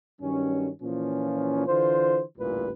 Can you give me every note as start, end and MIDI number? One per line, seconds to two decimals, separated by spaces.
0.21 0.69 43
0.21 0.69 51
0.21 0.69 54
0.21 0.69 61
0.82 1.67 46
0.82 1.67 52
0.82 1.67 53
0.82 1.67 61
1.67 2.23 50
1.67 2.23 52
1.67 2.23 65
1.67 2.23 72
2.38 2.72 33
2.38 2.72 38
2.38 2.72 46
2.38 2.72 52
2.38 2.72 55
2.38 2.72 71